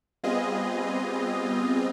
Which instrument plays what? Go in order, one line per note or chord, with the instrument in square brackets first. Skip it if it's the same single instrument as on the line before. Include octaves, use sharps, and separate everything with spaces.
[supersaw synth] G3 B3 C4 F4 G#4 D#5